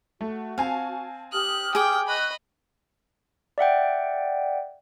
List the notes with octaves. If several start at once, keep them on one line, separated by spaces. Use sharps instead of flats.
A3 F#4
C4 F5 G#5 A5
G4 D#6 F6 F#6
G#4 G5 D6
D#5 B5 C#6 F#6
D5 E5 F#5 G5